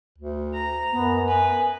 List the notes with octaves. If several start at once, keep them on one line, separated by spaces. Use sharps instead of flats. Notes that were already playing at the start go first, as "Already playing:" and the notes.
D2
A#5
F#2 B3
B4 G#5